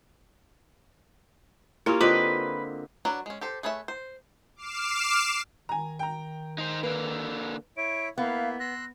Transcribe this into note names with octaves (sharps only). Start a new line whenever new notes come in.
A#3 C#4 E4 F4 G4
D3 C4 F4 B4 D#5
F#3 D4 F#4 A#4 B4
G#3 C#4
G4 A4 C5
A3 G#4 B4 C#5 E5
C5
D6 F6 C7 E7
D#3 G#5 A#5
G5 A#5
D#4 C5
D3 A#3 B4
E4 C#5 E5 D7
A#3 B3 E4 F5
C6 E6 F#6 A#6